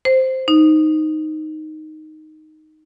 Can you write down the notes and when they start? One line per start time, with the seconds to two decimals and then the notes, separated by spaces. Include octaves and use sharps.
0.05 C5
0.48 D#4